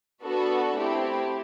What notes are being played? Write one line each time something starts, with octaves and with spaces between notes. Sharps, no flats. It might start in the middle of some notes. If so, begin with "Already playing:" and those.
B3 D4 F#4 A4
A3 C4 E4 G4